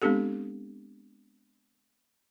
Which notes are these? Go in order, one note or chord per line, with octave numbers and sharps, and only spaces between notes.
G#3 B3 C4 D4 G4 A4